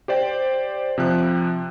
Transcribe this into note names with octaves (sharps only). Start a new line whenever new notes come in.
G4 C5 D5 G5
C3 F3 F#6